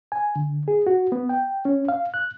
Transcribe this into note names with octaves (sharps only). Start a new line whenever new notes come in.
G#5
D3
G#4
F#4
B3
G5
C#4
F5
F#6